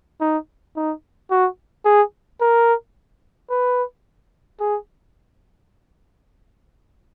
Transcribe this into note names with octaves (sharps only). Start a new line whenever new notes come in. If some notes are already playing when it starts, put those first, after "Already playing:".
D#4
D#4
F#4
G#4
A#4
B4
G#4